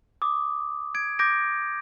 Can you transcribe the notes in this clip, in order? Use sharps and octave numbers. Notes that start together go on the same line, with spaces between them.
D6 D#6
G#6 D7
D6 G6 A#6 D7